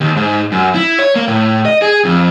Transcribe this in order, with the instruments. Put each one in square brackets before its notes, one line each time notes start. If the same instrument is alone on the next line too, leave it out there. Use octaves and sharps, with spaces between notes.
[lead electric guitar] D#2
G#2
F#2
E4
C#5
A#3
A2
D#5
G#4
F2